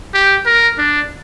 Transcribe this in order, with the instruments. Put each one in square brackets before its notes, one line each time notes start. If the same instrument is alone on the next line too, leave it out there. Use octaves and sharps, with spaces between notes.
[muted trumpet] G4
A#4
D4